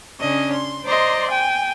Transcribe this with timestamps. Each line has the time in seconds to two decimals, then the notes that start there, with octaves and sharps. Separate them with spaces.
0.20 C#3 C#4 D4 D#5
0.53 C6
0.85 C5 D5 D#5 A#5 C6
1.28 G5 G#5